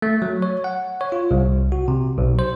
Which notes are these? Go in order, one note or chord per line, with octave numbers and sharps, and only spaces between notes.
A3
F#3
C#5
F#5
C#5
F4
C2
F#4
C3
B1
C5